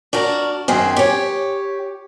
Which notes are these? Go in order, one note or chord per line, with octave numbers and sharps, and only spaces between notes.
D4 F#4 A#4
F#2 D#3 C4 G#4
G4 C#5